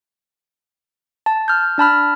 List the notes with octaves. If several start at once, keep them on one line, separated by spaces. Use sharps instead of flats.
A5
F6 G6
D4 A5 B5 F6